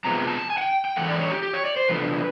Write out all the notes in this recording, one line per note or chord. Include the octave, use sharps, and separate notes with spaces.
F2 C3 F3 G#3 B3 A#5
A5
G#5
F#5
G5
G5
G#2 E3 A3 F#5
D5
C#5
G4
G4
C#5
D5
C5
E2 C3 F3 A3 D4 B4